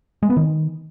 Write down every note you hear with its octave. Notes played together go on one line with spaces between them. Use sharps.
G#3
B3
D#3